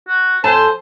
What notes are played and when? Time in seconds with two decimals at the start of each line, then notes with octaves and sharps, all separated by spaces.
0.08 F#4
0.44 F2 C5 G#5 A5